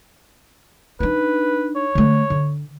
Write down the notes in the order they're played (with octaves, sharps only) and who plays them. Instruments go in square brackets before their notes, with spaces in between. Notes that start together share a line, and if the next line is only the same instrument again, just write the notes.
[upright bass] D4 D#4 [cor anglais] B4
[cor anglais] C#5
[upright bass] D3 A3
D3